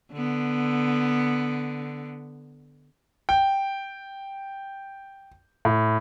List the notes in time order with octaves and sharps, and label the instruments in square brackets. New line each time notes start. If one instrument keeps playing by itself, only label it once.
[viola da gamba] D3 B3
[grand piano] G5
A2